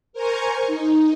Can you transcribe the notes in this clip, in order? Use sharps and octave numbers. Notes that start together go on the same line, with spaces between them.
A#4 C5 G#5 A#5 C#6
D#4